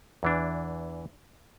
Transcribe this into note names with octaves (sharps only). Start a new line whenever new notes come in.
E2 E3 D4